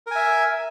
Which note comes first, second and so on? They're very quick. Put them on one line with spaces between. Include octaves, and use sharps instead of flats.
A#4 G#5 E5